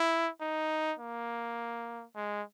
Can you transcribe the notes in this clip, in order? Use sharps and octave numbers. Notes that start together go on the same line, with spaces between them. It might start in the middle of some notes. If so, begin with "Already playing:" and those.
Already playing: E4
D#4
A#3
G#3